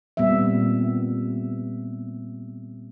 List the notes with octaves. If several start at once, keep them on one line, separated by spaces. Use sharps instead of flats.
A#2 G3 B3 C4 E5